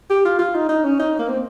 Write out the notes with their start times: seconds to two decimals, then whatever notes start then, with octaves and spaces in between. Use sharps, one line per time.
0.10 G4
0.25 F4
0.39 F4
0.55 D#4
0.69 D#4
0.84 C#4
0.99 D#4
1.19 A#3
1.28 C4